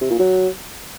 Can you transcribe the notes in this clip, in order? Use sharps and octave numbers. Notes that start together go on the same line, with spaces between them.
C3
A#2
F#3